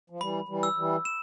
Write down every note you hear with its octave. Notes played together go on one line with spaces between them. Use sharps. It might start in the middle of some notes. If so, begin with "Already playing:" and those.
F3
E3 G3 B5
E3 G3
E6
E3 G3
E7